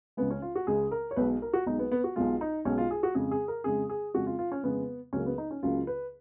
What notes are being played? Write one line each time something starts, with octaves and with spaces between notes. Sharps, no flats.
C#2 C#3 G#3 B3
C#4
F4
F#4
C#2 C#3 G#3 G#4
A#4
C#5
B1 B2 G#3 B4
A#4
F#4
B1 B2 G#3 D#4
B3
B3
F#4
B1 B2 G#3 F4
D#4
B1 B2 G#3 C#4
F4
G#4
F#4
F2 C#3 G#3 G#4
G#4
A#4
F2 C#3 G#3 G#4
G#4
F2 C#3 G#3 F#4
F4
F4
C#4
F2 C#3 G#3 B3
C#2 C#3 F#3 A#3 C#4
B3
D#4
C#4
C#2 C#3 F#3 A#3 F4
B4